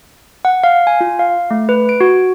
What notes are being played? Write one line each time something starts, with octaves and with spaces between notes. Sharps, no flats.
F#5
F5
G#5
F4
F5
A3
B4
D7
F#4